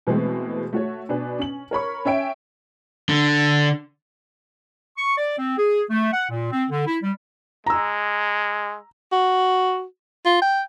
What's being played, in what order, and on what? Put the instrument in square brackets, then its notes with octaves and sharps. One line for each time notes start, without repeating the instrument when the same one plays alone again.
[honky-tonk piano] B2 E3 G#3 A3 C4
A3 F#4 C#5
B2 D4 B4 G#5
C#4 F#7
A#4 C#5 B5 C#6
C#4 C#5 E5 G5 D7
[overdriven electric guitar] D3
[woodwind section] C#6
D5
C4
G#4
A3
F#5
A#2
C4
D3
E4
G3
[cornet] G#3 [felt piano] A#5 E6
[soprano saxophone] F#4
F4
G5